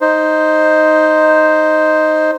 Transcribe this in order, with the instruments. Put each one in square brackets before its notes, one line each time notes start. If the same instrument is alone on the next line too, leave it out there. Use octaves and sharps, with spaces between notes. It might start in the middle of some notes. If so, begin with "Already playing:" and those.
[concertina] D#4 C5